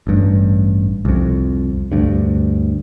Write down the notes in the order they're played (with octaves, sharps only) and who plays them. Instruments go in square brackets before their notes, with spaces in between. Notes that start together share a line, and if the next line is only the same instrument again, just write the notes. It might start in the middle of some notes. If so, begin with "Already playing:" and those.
[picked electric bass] A1 G2
C2 F2
D2 G2